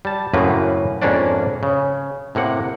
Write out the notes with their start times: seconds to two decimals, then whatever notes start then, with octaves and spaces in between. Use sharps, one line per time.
0.05 G3 A5
0.34 F#2 A2 C#3 A#3 C4 B4
1.02 F2 G#2 A#3 C#4 D4 D5
1.63 C#3
2.35 A2 C3 A#3 F#5